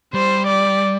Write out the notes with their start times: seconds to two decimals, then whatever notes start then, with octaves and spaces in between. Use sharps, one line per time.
0.14 G3 C5
0.47 D5